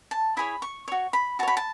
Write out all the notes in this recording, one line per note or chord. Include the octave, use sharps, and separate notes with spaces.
A5
E4 G#4 C#5 B5
C#6
F#4 C#5 C#6
B5
F#4 C#5 A5 B5
A5